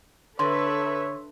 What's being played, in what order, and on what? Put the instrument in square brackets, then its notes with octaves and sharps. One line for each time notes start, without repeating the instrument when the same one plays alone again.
[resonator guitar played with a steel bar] D3 [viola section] A4 B4 E5 [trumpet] C#5 [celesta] C6